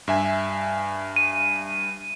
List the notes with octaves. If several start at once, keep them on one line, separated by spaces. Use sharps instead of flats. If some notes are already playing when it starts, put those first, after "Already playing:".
G2 E5 G#5
D#7